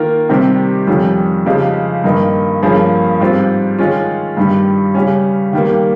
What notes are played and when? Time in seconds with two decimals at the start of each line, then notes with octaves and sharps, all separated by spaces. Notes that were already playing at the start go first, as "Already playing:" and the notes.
Already playing: D#3 A#3 F4 A#4
0.29 C3 D#3 G3 C4 G4
0.87 F2 D#3 G3 C#4 F4
1.46 C#3 F3 G#3 D#4 G4
2.04 G2 D#3 A#3 D#4
2.63 G2 F3 A#3 C#4 G#4
3.20 G#2 G3 C4 F4
3.78 D#3 G#3 C#4 F4
4.37 G2 D#3 G3
4.95 C#3 G3 C#4
5.53 D#3 G3 A#3